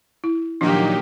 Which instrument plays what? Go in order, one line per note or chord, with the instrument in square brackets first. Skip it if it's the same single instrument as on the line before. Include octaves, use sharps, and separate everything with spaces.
[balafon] E4
[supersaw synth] A#2 F#3 D#4 [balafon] D#3 F3 D4 [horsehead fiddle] A#3 G4